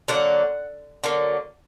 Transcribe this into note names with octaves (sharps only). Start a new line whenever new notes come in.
D3 F#3 A#3 F#5
D3 F#3 A#3